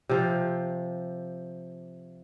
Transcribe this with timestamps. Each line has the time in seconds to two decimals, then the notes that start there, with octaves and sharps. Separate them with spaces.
0.09 C3 F3